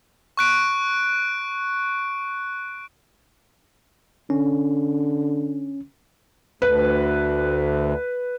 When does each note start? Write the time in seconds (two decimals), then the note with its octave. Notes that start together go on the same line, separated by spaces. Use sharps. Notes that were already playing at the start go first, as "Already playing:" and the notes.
0.37 C#6 F#6 D7
4.30 D3 C#4
6.62 D2 B4